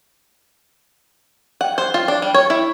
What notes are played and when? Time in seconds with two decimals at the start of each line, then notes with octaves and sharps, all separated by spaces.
1.61 F#5
1.78 C5
1.94 F4
2.08 D4
2.22 G3
2.34 C#5
2.50 E4